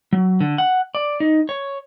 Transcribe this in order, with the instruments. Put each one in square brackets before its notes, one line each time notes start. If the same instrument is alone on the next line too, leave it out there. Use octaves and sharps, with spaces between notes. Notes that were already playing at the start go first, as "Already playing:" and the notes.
[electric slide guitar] F#3
D3
F#5
D5
D#4
C#5